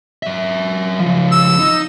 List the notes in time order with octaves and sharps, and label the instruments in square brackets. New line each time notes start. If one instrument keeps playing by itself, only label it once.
[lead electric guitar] F#3 E5
C#3 F3
[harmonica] E6
[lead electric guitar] D#4